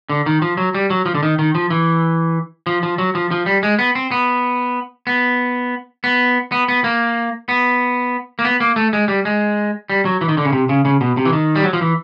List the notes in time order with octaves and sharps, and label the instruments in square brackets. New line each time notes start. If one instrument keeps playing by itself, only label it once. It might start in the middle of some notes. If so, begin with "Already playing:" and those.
[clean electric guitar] D3
D#3
F3
F#3
G3
F#3
F3
D3
D#3
D#3
F3
E3
F3
F3
F#3
F3
F3
G3
G#3
B3
C4
B3
B3
B3
B3
B3
A#3
B3
A#3
B3
A#3
A3
G#3
G3
G#3
G3
F#3
E3
D#3
D3
C#3
C3
C#3
C#3
B2
C3
E3
D#3
G3
F#3
F3
E3